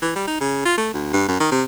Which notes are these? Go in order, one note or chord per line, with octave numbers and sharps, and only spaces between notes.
E3
G3
D#4
C#3
F4
A3
D2
G2
F#2
D#3
C3